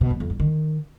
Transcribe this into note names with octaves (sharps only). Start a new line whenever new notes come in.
B2
F#2
F2
G2
D#3